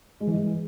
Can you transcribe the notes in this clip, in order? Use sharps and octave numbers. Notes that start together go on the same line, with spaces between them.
G#3
E3
G#3